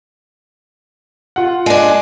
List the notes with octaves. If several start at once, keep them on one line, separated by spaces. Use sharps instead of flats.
F4 F#5
G#3 D4